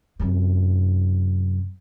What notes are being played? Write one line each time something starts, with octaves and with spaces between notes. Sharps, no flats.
F#2 C3